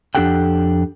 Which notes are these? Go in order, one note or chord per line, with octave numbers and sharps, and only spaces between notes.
F2 D4 G4 A4 F#5 G5